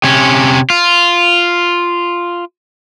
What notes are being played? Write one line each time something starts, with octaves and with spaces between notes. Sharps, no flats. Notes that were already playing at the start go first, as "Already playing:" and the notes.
C3 C#4
F4